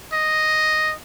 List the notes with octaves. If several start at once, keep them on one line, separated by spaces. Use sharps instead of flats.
D#5